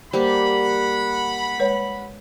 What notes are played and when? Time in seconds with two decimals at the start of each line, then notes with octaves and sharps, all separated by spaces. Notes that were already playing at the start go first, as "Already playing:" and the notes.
0.13 G3 A#3 G4 C5 F#5 B5
1.59 G#3 B4 C#5